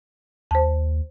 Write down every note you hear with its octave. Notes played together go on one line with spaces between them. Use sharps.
D#2 C5 A5